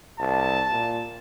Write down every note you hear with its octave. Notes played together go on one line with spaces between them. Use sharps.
C2 A5
A#2